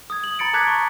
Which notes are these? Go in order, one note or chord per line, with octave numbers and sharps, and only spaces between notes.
D#6 G#6
F#7
A#5 B5 A6 C#7 D7
A5 A#5 D6 F#6 G#6 B6
C#6